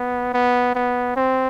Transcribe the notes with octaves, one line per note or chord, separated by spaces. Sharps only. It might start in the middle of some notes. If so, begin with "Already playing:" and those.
Already playing: B3
B3
B3
C4